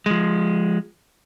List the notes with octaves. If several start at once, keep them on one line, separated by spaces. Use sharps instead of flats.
F3 G#3